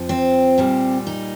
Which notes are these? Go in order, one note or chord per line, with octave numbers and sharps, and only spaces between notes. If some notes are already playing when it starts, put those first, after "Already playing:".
Already playing: F2 F3
C4
A#2 G3
D#4